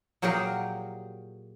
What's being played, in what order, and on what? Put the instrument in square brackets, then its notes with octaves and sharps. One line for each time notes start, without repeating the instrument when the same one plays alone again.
[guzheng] A#2 F#3 G4 G#4 A#4